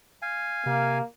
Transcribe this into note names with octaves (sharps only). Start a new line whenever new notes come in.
F5 G#5
C3 A#3